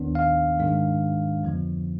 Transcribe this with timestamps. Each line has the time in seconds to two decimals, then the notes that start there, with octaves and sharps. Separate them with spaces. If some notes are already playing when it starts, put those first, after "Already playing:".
Already playing: D#2 D#3 B3 D4
0.15 F5
0.58 G#2 D#3 G#3 D4
1.43 F2 D3 F3 B3